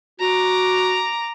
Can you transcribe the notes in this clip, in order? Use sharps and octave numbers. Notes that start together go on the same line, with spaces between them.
F#4 A#5 D6